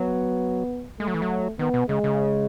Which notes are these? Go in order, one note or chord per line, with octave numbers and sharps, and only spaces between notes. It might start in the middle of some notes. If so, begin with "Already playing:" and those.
Already playing: F#3 B3
G#3 A3
F#3
E3
F#3
D#3 B3
B2
C#3 G#3
C#3